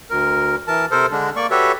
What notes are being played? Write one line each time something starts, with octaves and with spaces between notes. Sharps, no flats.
D2 A#4
E3 A#4 A5
C3 A4 A#4 C5
D3 G#3 D4
A#3 D5 C#6
F#4 G4 A4 B4 C#5 E5